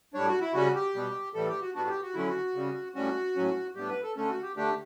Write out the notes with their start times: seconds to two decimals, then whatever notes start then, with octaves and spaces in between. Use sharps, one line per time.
0.14 A2 G3 D4 C#5
0.27 F#4
0.41 E4
0.54 C#3 G3 C#4 F#4
0.75 G4
0.95 B2 G3 B3
1.34 A2 E3 G3 A4
1.48 G4
1.61 F#4
1.75 A2 G3 B3 D4 F#4
1.89 G4
2.02 F#4
2.14 D3 F#3 C#4 E4
2.28 F#4
2.55 C#3 G3 C#4
2.95 A2 G3 C#4 F#4
3.36 A2 F#3 C#4
3.75 A2 G3 B3 D4 G4
3.89 B4
4.03 A4
4.16 D3 A3 C#4 A4
4.29 F#4
4.43 G4
4.56 D3 A3 D4 G4